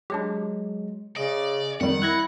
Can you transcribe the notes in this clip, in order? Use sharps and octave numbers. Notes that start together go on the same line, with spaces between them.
F#3 G#3 D4 G4
C#3 D5 D#5
F2 D#3 G3 F#5
E4 F#6 G#6 A#6